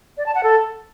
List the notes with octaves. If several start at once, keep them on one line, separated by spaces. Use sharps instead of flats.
D5
A5
F#5
A4